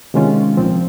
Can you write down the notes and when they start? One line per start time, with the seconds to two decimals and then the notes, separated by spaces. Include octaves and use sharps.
0.14 C3 D#3 G#3 C#4 F4
0.57 C2 A#2 F3 C4